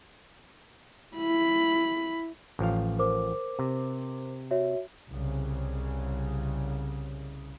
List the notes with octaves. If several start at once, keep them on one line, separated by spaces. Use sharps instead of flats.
E4 B5
A1 F3 F5
A#4 C5 D6
C3
F#4 C#5 E5
C2 C#3